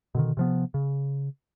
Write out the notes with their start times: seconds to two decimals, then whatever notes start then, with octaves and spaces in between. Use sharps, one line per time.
0.15 B2 D3 D#3
0.37 C3 F3 B3
0.74 C#3